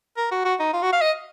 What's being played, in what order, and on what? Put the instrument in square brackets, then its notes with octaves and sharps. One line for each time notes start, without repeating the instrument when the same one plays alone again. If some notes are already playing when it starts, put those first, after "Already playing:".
[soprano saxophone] A#4
F#4
F#4
D#4
F4
F#4
F5
D#5